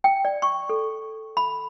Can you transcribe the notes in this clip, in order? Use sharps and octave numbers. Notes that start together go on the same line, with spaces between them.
G5
D5
C#6
A4
B5